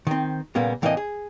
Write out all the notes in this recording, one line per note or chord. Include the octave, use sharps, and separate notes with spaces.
D#3 C4
A#2 C#3 G3 A#3 B3
A2 E3 A#3 C4 D4 D#5
G#4